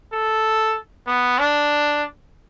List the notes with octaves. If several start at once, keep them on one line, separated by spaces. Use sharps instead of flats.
A4
B3
D4